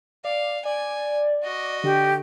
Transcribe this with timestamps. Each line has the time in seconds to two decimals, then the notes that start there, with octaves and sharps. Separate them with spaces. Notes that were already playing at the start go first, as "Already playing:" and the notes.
0.24 D5 F5
0.65 D5 G#5
1.43 F#4 D#5
1.84 D3 G4